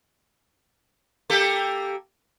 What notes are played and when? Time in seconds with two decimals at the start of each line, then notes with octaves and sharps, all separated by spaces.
1.30 A#3 G4 A4